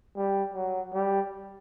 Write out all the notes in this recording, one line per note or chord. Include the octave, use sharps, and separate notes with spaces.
G3
F#3
G3